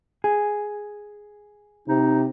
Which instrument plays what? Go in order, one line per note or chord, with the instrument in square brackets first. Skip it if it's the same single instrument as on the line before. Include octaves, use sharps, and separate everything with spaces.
[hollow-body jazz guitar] G#4
[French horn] C3 [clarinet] D#4